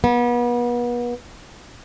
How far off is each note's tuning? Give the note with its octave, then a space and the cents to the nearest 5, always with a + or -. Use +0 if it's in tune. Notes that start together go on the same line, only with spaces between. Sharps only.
B3 -35